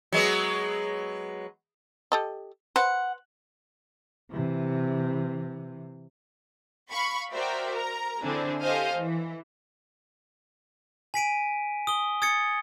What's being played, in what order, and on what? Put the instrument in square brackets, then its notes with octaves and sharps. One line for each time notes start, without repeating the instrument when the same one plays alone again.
[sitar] F#3 G#3 B3
[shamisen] G4 A4 D#5
[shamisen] B4 C5 [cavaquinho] F#5
[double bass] C3 E3
[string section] F5 B5 C#6
F#4 A#4 C5 D5 E5 G5
A#4 A#5
D3 C4 D4 E4 G#4
G4 A4 C5 D#5 F5 G#5
E3
[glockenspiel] G#5 B6 D7 D#7
D#6 G7
D#6 G#6 A6 C#7